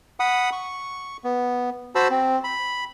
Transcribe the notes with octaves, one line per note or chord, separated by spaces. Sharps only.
F#5 B5 D#6
C#6
B3
F#4 C5 A5 B5 E6
C4
B5